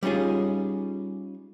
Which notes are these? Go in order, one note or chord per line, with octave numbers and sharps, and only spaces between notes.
G3 C#4 D#4 F4 G#4